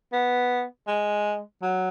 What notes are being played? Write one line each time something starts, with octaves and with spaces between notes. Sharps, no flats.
B3
G#3
F#3